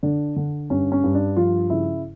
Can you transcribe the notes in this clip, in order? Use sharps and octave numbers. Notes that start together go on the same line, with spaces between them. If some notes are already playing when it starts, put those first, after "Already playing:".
D3 D4
D3
G2 C#4
C#4
G2
D4
F3 F4
C#3 E4